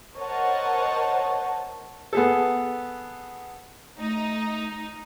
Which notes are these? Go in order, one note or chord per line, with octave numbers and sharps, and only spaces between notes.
A#4 C5 C#5 D#5 F#5 A5
B3 G#4 A4
A3 D#4